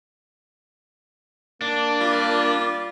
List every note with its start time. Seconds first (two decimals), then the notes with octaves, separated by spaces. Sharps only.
1.61 A#3 D4
2.01 G3 F4 D6